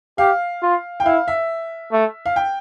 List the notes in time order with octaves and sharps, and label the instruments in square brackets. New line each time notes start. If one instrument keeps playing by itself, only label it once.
[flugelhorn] G4 [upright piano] F5
[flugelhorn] F4
[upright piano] G5
[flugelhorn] E4 [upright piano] F5
[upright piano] E5
[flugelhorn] A3
[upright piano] F5
G5